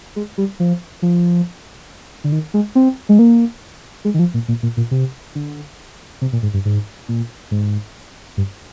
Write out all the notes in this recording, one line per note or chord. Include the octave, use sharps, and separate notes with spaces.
G#3
G3
F3
F3
D3
D#3
G#3
C4
G#3
A#3
G#3
D#3
F3
A#2
A#2
A#2
A#2
C3
D3
C3
A#2
G#2
G2
G#2
A#2
G#2
G2